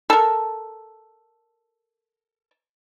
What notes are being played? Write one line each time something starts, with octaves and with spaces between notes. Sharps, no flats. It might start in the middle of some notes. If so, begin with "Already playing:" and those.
A4 A#4